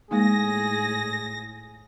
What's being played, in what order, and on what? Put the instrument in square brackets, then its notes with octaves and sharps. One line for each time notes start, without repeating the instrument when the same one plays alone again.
[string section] A2 A#6 [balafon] G#3 A#3 D#4 [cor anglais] G#4